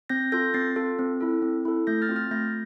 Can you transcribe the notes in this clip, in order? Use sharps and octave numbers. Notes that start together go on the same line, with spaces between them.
C4 G6 A#6
F4 A4 G6 A#6
C4 A6 C7
F4 A4
C4
E4 A4
C4
E4 A4
A3 G6 A#6
F6 A6
C4 F4
F6 A6
A3 G6 A#6